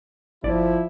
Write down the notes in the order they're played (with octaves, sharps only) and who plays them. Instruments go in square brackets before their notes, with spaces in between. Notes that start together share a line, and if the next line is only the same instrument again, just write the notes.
[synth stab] G1 D5 [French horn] F3 [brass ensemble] E4